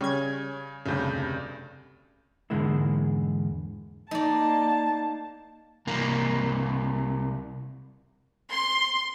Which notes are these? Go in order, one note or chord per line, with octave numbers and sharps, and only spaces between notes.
C#3 G3 C#4 G#6
F1 D2 G2 C#3 G6
E2 G#2 D3 G#3 A#3 E4
A#3 D#4 D5 A5
C2 A#3
C6